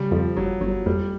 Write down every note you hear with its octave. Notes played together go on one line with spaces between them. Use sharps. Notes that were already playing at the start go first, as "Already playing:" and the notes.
Already playing: C#3 G3
F2 F3
G1 F#3
G1 F#3
F2 G3